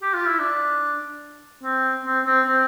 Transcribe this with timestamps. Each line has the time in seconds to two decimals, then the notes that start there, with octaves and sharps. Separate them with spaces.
0.02 G4
0.14 F4
0.27 E4
0.39 D4
1.63 C4
2.05 C4
2.26 C4
2.46 C4